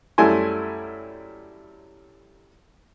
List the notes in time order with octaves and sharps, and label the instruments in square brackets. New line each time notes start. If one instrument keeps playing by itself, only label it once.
[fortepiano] F#2 G3 A3 E4 G#5 C6